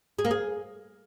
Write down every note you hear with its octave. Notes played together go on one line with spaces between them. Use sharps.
G#4
A#3
G#4